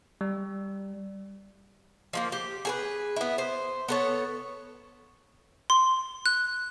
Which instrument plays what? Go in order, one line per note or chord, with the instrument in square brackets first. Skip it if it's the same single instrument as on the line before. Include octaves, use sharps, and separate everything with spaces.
[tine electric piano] G3
[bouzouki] F3 G#3 A#3
G4
G#4 A4 B4
B3 E4
C5
B3 A4 C#5
[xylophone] C6
F#6